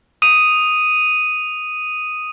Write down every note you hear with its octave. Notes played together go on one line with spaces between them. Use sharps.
D#6 D#7